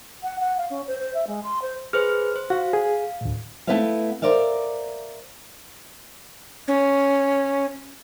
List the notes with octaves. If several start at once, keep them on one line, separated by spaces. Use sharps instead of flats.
F#5
F#5
F5
C#4
C5
C5
E5
G#3
C6
C5
G#4 B4 C5 F6
C5
F#4 F5
G#4
D2 A2
A3 B3 E4 B4 E5 F5
A#4 C5 D5 E5 F5
C#4